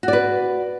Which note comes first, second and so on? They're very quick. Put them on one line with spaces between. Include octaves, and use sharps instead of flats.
F#4 D5 B4